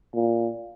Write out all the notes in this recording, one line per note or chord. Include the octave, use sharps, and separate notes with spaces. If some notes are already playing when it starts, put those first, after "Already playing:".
A#2